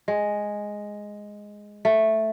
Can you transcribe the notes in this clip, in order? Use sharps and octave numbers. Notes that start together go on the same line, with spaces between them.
G#3
A3